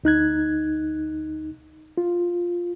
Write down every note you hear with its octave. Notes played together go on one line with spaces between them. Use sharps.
D2 D#4 F#6 G#6
F4